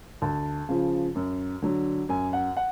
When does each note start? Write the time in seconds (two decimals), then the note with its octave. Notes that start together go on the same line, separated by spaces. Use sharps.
0.22 D2 A5
0.69 C#3 F3
1.15 F#2
1.62 D3 F#3
2.09 F#2 G#5
2.33 F#5
2.57 F#5